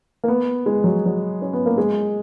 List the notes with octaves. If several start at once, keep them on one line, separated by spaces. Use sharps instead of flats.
A#3
B3
G#3
F#3
F#3
C#4
B3
A#3
G#3